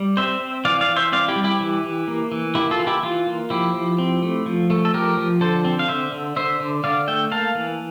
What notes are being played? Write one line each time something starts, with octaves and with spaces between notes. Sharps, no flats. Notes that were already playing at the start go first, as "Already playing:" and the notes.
Already playing: G3
C4 C5 E5
C4
E3 D5 F5
D5 F5
E3
C5 E5
C4 D5 F5
E4 G4
G3
E4 G4
E3
E3
A#3
E3
A#3 E4 G4
F4 A4
E3
E4 G4
E3 F4
A#3
F3 E4 G4
F3
C4
A3
F3
A3
A4
F3 G4 A#4
F3
D3 A4 C5
C4
F5
D3 C5 E5
D3
D3 C5 E5
D3
D3 D5 F5
A3 E5 G5
A#3 F5 A5
E3